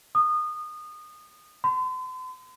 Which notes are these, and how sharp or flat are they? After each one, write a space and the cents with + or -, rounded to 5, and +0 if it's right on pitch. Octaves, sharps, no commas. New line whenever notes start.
D#6 -25
C6 -45